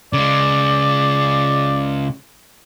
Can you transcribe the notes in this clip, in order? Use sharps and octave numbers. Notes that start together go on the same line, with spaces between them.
C#3 G#3 D5